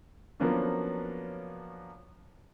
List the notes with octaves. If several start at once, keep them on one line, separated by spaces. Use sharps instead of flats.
F3 F#3 A#3 B3 C#4 D4